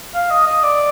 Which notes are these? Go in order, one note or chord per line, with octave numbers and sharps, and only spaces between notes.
F5
D#5
D#5
D5